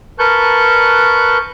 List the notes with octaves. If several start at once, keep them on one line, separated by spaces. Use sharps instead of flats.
A#4 B4 A5 C#6 F#6 G6